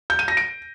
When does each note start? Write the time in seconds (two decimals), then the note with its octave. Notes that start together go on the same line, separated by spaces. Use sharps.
0.10 G6
0.19 D#7
0.28 A#6
0.37 D7